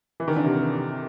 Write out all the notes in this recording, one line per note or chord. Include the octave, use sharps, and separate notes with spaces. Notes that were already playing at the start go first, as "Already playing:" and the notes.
E3
D#3
D3
C3